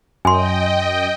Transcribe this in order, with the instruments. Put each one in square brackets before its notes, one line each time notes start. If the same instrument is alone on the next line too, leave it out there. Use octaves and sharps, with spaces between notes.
[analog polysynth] F#2 [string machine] D#5 G5 [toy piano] G#5 C6